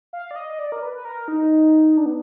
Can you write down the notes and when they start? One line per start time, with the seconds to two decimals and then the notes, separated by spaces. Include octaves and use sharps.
0.13 F5
0.31 D5
0.36 D#5
0.59 D5
0.72 A#4
0.82 B4
0.94 B4
1.05 A#4
1.28 D#4
1.97 D4
2.06 B3